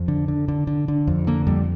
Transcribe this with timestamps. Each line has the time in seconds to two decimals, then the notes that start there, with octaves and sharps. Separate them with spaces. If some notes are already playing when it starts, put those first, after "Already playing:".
Already playing: F2
0.08 D3
0.28 D3
0.48 D3
0.67 D3
0.88 D3
1.07 F2
1.27 D3 A#3
1.47 F2 G3